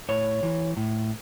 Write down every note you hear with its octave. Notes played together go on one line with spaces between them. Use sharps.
A2 C#5
E3
A2